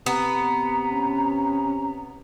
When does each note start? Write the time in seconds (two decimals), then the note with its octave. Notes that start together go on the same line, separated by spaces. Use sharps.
0.06 C3 B3 A#5
0.90 C#4